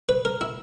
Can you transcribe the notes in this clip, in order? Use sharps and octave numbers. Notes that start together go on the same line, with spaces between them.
B4
A#4
E4